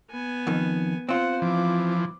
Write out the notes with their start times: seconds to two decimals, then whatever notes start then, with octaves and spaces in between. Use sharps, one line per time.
0.10 B3 G#5
0.47 F2 D#3
1.09 C4 F4 C5 F#5
1.42 E3 F3 D6